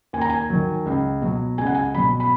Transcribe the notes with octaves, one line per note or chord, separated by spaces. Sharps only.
D#2 G#5
A#5
G#5
D#3 F#3
C#2
B2 F#3
C#2 G#5
F#5
G#5
B2 F#3 B5
B5